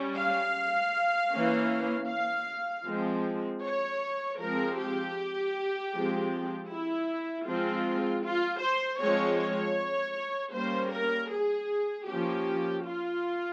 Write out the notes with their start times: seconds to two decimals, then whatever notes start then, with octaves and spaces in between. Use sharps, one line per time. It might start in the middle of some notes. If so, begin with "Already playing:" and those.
Already playing: G3 C#4
0.16 F5
1.32 E3 A#3 C#4
2.08 F5
2.85 F3 G#3 C4
3.62 C#5
4.39 F3 G#3 C4 A#4
4.77 G4
5.93 F3 G#3 C4
6.70 E4
7.46 F3 G#3 C4 F4
8.24 F4
8.61 C5
9.00 F3 G#3 C4 C#5
9.39 C#5
10.53 G3 A#3 C#4 C5
10.92 A#4
11.31 G#4
12.07 F3 A#3 C#4 G4
12.84 F4